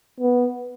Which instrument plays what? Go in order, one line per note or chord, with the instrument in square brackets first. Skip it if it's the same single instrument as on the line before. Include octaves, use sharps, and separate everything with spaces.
[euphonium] B3